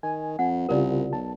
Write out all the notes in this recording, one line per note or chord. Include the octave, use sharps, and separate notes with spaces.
D#3 G#5
F2 F#5
C2 C#3 F4 G4 A#4 D5
B1 A5